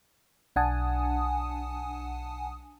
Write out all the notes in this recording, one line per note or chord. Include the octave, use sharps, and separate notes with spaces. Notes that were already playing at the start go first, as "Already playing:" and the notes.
B1 D4 F#5 G#5 A5 D#6